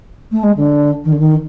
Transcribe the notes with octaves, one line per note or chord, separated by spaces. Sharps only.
A3
G#3
D3
D#3
D3
D#3